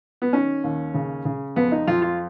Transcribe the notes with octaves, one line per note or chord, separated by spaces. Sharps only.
B3
D#3 C#4
D#2
C#3
C#3
F2 B3
D#4
F2 F4
F4